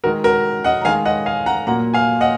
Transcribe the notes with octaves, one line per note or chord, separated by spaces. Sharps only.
D#3 G#3 F#4 A#4
F#4 A#4
D#5 F#5
A#5
D#3 G#3 F5 G#5
D#5 F#5
F5 G#5
F#5 A#5
A#2 F#3 A#3 F#5 A#5
F5 G#5
D#5 F#5